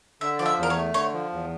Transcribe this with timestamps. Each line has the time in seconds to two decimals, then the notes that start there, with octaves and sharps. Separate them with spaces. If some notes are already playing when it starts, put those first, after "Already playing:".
0.21 D3 E5
0.39 F3 D5
0.46 E5
0.58 E2 A#4
0.70 C#5
0.76 A3
0.94 D3 C#5
1.13 F3
1.32 E2